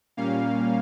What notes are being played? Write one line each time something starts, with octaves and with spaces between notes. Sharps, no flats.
A#2 G3 A#3 C#4 F5